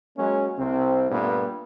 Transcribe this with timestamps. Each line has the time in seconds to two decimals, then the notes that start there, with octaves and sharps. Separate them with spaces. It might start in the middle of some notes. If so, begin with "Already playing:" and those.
0.17 F#3 G#3 A#3 C#4
0.58 C2 C3 C4
1.10 G2 A#2 A3 B3